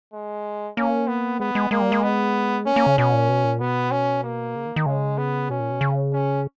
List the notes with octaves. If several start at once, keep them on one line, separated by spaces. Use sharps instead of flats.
G#3
A#3 C#4
B3
G#3 B3
G#3
G#3 A#3
G3
G#3
B3
A#3 C#4
A#3
C#3
B2 C#4
A#2
B2
A#2
B2 B3
C#4
A#3
C#3
D#3
D#3
C#3 G#3
B3
B2 C#4
A#2
B2
C#3
C#4